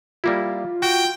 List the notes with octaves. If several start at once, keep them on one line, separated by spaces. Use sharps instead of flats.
G3 A#3 E4 F4
F#4 G5